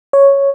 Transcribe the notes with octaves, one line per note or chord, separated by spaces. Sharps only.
C#5